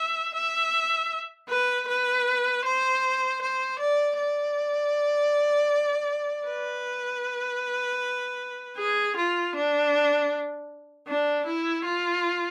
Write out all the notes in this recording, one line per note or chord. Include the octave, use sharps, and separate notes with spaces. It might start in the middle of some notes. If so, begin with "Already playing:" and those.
Already playing: E5
E5
B4
B4
C5
C5
D5
D5
B4
G#4
F4
D4
D4
E4
F4